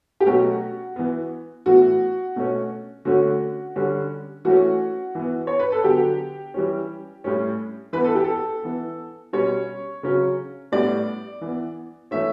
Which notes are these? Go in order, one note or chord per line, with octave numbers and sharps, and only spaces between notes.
G4
B2 F#3 A3 C#4 F#4
E3 B3
A2 E3 B3 F#4
B2 A3 C#4
D3 A3 C#4 F#4
D3 G3 C#4
E3 A3 C#4 F#4
E3 B3
C#5
B4
A4
D3 F#3 B3 G4
E3 G3 C#4
A2 G3 C#4
E3 B3 B4
A4
G4
A4
E3 B3
B2 G3 C#4 C#5
C#3 F#3 C#4
A2 G3 B3 D5
E3 B3
E3 A3 C#4 E5